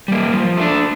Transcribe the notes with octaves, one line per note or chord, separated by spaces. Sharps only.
G3 A#3
F3
A3 D4